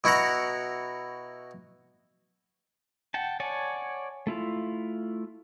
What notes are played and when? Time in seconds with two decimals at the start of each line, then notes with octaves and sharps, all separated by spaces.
0.04 B2 E4 F#4 F#5 A#5
3.14 F#5 G5 A5
3.40 C#5 D5 F#5 G#5 A5
4.27 A3 E4 F4